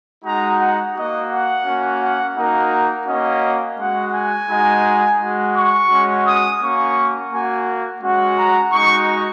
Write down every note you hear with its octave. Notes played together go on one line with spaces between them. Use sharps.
G#3 D#4 F#4 A#5
F#5
A#3 F#4 D#5
F#5
A#3 C#4 F#4
F#5
A#3 D#4 F#4 A#4
A#3 C#4 F#4 D#5
G#3 F#4 F#5
G#5
G#3 D#4 F#4
G#3 F#4
C#6
G#3 C#4 F#4
D#6
A#3 C#4 F#4 C#6
A#3 F#4 G#5
G#3 C#4 F#4
A#5
G#3 D#4 F#4 C#6